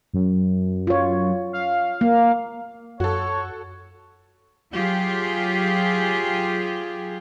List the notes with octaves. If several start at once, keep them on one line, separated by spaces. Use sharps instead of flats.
F#2
F4 C#5
F5
A#3
F#2 F#4 A4 C#5
F#3 F4 G4 G#4